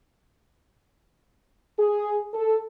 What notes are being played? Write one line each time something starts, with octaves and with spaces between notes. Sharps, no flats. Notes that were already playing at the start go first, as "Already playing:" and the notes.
G#4
A4